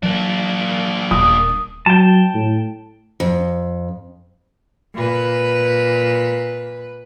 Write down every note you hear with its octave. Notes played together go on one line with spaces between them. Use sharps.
E3 F#3 A#3 D4
D#1 D#6
F#3 G5 A5
A2
F2
A#2 B4